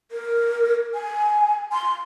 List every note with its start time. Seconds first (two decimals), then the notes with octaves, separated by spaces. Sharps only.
0.11 A#4
0.94 G#5
1.73 C6